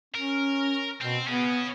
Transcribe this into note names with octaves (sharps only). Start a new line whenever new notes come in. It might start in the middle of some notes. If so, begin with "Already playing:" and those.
C#4 A#4
B2 C4
B3 C#4 G#4